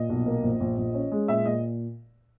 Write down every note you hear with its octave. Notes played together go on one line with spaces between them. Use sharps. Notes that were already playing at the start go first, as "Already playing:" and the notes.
Already playing: A#2 D#5
B1
A#3
A#1
A#1
A#1
C#4
G#3
A#2 E5
A#2 D#5